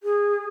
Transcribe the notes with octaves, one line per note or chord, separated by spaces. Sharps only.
G#4